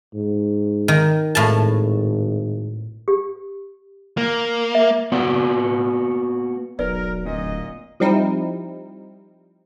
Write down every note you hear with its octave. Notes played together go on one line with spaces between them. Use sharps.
G#2
D#3
G#1 A2 A5
G4
A#3
E5
A#3 B3 F#4 D5
E1 B1 A#4 B4 D5
D1 A#2 D#5
F3 G3 C4 D#4 E4